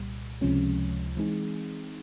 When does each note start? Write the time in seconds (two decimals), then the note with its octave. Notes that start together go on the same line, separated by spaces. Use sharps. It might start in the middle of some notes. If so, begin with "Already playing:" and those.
Already playing: C2 A#2 G3
0.41 C#2 C3 F3 G#3 C#4
1.17 E3 G#3 C4 D#4 G#4